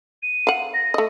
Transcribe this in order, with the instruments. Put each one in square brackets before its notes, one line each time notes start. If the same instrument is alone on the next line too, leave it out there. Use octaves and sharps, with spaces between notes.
[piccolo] D#7
[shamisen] F5 F#5
[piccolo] A#6
[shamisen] A3 D#5